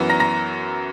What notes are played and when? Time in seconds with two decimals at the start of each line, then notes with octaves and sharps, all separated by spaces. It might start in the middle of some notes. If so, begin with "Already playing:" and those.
Already playing: F#2 E3 B3
0.09 A#5 A#6
0.20 A#5 A#6